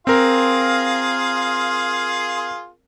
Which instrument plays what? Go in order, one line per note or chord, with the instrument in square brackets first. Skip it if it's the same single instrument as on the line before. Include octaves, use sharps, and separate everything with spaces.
[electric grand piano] C4 A#4 [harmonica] F4 G#4 F5